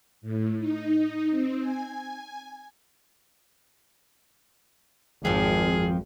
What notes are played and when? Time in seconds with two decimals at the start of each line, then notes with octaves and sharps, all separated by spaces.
0.21 A2
0.58 D#4
1.30 C4
1.61 G#5
5.25 G#1 F2 F3 G#4